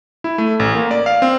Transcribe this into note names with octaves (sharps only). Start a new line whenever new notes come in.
E4
A3
A1
A#3
D5
F5
C4